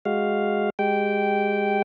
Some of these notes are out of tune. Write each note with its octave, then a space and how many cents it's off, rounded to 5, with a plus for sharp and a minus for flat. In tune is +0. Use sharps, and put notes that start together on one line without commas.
G#3 +0 F#4 +10 F5 +0
G#3 -15 G4 -15 G5 -10